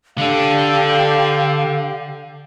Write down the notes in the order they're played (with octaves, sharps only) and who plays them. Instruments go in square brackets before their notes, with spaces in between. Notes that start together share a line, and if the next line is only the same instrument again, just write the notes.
[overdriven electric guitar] D3 D4 [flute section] G4 A4 F5